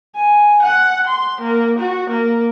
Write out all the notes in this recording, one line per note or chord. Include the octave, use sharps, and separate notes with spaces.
G#5
F#5
C6
A#3
F#4
A#3